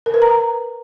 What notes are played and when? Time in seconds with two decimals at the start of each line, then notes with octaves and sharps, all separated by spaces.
0.06 A#4
0.14 B4
0.22 A#5